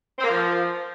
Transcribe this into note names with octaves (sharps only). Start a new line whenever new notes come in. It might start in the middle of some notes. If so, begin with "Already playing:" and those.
C4
A#3
F3